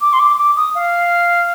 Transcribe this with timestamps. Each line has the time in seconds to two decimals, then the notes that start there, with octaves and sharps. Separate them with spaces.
0.01 D6
0.13 C6
0.19 D6
0.38 D6
0.57 D#6
0.75 F5